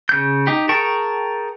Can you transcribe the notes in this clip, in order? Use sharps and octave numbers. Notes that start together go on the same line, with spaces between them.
C#3 G6
D#4 G4
G#4 A#4 G5 A5 C#6